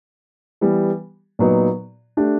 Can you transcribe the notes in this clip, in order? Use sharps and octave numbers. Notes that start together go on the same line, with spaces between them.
E3 G3 B3
A#2 F#3 B3 D#4
A3 D4 G4